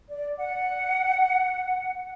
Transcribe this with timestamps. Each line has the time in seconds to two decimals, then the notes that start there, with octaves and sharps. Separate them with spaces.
0.09 D5
0.38 F#5